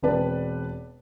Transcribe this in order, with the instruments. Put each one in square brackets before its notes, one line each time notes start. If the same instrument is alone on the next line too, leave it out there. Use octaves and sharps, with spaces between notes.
[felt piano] E1 C4 B4 D5 A5